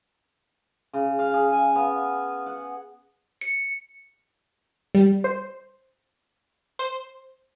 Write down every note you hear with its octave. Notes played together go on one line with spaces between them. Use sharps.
C#3
F5
G#4
G#5
B3
F#5
C#7
G3
C5
C5